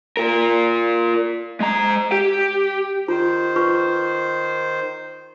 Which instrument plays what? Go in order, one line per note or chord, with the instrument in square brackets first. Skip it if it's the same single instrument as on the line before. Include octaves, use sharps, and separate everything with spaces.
[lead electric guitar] F4 A#4
G#3 A#5
G4
[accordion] D#3 C5 [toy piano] F4
[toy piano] F4 B4 C#6